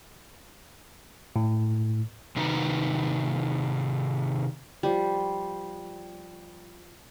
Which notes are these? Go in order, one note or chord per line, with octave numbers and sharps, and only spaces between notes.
A2
C3 D#3 D#4 F#4 B4 A#5
F3 G3